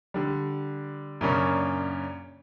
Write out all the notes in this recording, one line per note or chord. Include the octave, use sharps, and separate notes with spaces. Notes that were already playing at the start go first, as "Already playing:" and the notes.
D3 G3
F#2 A#2 C#3 A#3 C#4 D4